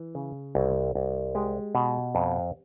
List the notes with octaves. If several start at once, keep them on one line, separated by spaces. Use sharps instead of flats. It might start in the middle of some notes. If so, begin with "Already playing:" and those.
Already playing: E3
C#3
C2
C2
G#3 G4
B2
F2